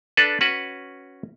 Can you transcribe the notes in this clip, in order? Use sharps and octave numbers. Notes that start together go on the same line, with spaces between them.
D4 A4 B4
C#4 F#4 B4